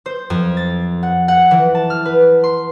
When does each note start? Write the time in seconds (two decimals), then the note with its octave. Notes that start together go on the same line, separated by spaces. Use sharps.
0.06 C5
0.30 F2
0.57 A6
1.03 F#5
1.28 F#5
1.51 E3
1.75 A5
1.90 F6
2.05 B4
2.44 C6